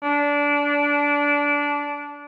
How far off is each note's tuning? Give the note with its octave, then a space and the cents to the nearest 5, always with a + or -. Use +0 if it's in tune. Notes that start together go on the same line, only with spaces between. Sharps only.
D4 -20